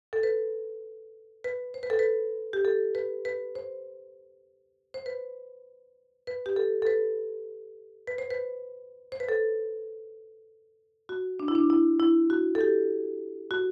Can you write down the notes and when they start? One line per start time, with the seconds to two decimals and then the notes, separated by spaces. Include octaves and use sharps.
0.13 A4
0.23 B4
1.44 B4
1.74 C5
1.83 B4
1.90 A4
1.99 B4
2.53 G4
2.65 A4
2.95 B4
3.25 B4
3.55 C5
4.94 C5
5.06 B4
6.27 B4
6.46 G4
6.56 A4
6.82 A4
6.87 B4
8.07 B4
8.18 C5
8.31 B4
9.12 C5
9.20 B4
9.29 A4
11.09 F#4
11.40 D4
11.48 E4
11.55 D4
11.70 E4
12.00 E4
12.30 F#4
12.55 A4
12.61 G4
13.51 F#4